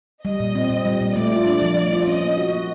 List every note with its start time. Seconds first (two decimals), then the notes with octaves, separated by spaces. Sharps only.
0.25 G3 D#5
0.40 A#2
0.55 C4
0.70 A#2
0.85 G3
1.01 A#2
1.16 A3 D5
1.31 F4
1.46 D4
1.62 F3
1.77 A3
1.92 F4
2.07 C#4 D#5
2.22 A#3
2.38 F#4
2.53 A#3